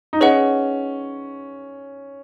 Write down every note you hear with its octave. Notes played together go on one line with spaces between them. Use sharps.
D#4
C#4 G#4 B4 D#5 F#5